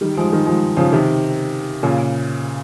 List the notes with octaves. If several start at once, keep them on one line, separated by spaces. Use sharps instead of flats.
D#3 G3
F3 G#3
D#3 G3
F3 G#3
C#3 F3
C3 D#3
A#2 C#3